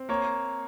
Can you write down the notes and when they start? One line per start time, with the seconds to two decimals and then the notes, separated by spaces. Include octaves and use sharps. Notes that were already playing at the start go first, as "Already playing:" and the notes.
Already playing: C4
0.09 A#3 C#5